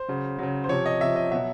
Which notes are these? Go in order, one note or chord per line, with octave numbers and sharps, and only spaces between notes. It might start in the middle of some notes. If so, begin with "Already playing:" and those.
Already playing: C5
C#3 F#3
C#3 F#3
C5
C3 F3 C#5
D#5
C3 F3 E5
D#5
B2 F#3 E5